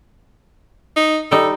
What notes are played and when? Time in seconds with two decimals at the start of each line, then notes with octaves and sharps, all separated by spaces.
0.96 D#4
1.32 G3 D#4 A4